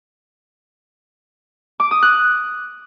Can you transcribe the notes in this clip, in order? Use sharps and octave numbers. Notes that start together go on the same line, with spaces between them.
D6
D#6
F#6